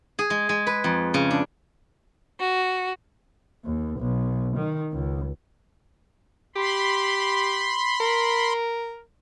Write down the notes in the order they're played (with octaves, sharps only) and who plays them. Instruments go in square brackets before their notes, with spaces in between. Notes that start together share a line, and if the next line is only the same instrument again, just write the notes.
[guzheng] G#4
G#3
G#3
B4
F2
C#3
D4
[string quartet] F#4
[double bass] D#2
B1
D#3
C#2
[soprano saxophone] G4 [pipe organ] B5 C6
[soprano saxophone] A#4